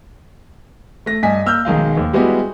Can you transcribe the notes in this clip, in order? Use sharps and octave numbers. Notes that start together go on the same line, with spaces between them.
A3 A#6
G2 D#5 G#5 B6
A#3 E6 F6 G6
B1 D#3 G#3 F5
D#2
G3 G#3 B3 E4 F#4 G4